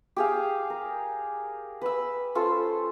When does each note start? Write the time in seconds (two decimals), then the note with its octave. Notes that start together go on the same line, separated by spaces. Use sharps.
0.16 G4 G#4 F5
0.70 A#4
1.81 B4 E6
2.35 C#4 F4 A4 C5